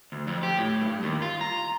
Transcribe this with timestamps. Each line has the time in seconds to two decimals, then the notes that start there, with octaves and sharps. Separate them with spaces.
0.12 D2
0.27 F2
0.43 G4
0.57 A2
0.82 G2
1.03 D#2
1.22 F4
1.41 A#5